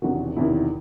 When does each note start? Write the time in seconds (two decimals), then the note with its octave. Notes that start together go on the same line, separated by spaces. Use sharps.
0.02 E1 E2 C3 D#3 F#4
0.37 E1 E2 C3 D#3 E4